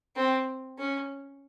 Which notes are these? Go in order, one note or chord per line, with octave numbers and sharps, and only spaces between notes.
C4
C#4